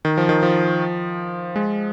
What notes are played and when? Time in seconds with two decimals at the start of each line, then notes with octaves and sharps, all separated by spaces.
0.05 D#3
0.18 F3
0.29 D#3
0.43 F3
1.56 G#3